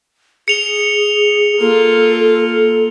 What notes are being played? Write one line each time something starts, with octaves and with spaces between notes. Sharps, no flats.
G#4 C#7 F7 G7
A#3 F4 A4